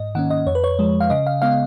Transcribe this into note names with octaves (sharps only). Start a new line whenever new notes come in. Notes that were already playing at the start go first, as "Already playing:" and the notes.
Already playing: G#2 D#5
D#3 A#3 C#4 F#5
D#5
F2 C#5
B4
C#5
F3 G#3
F5
C#3 D#5
F5
G#3 B3 F5